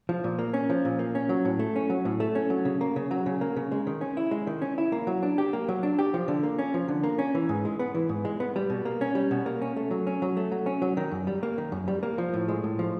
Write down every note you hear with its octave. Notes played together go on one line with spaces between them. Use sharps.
F3
A#2
A#3
C#4
F3
A#2
A#3
C#4
F#3
A2
A3
C#4
F#3
A2
A3
C#4
F#3
C#3
A#3
C#3
F#3
C#3
A#3
C#3
G#3
D#3
C#4
E4
G#3
D#3
C#4
E4
A#3
F#3
D4
G4
A#3
F#3
D4
G4
F3
D3
A#3
C#4
F3
D3
A#3
C#4
E3
G#2
G#3
B3
E3
G#2
G#3
B3
G3
B2
A#3
C#4
G3
B2
A#3
C#4
A3
F#3
C#4
F#3
A3
F#3
C#4
F#3
D#3
F#2
G3
A#3
D#3
F#2
G3
A#3
F3
A2
G#3
A2
F3